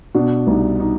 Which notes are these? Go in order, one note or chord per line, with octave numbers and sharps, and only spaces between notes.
B2 D4
C2 D#4
D#4